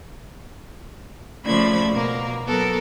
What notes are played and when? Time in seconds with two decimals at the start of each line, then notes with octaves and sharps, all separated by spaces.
1.45 C#3 F3 A3 D5 B5 G#6
1.92 B2 A#3
2.47 F#3 B3 A4 A#4